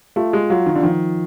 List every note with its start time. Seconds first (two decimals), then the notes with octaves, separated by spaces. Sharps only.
0.16 A3 F4
0.33 G#3
0.50 F#3 F4
0.66 D#3
0.75 D3
0.83 D#3 F3